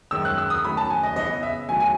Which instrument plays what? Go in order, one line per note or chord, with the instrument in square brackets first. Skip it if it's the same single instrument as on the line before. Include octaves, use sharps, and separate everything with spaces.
[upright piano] F#2 D#3 G#3 C#4 E6
F#6
E6
D#6
D#3 F#3 A3 C#4 B5
A5
G#5
D#5
C#3 E3 B3 D#5
E5
D#3 F#3 A3 C#4 G#5
G#5